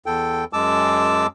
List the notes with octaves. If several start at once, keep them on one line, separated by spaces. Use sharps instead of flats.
E2 A4 G5
F#2 G#3 A5 D6 E6